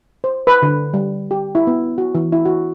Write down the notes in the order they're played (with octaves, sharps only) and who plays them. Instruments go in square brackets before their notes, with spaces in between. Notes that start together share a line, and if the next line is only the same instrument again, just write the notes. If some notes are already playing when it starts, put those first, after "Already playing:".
[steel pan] C5
B4
D3
G3
G4
E4
B3
F#4
E3
E4
F#4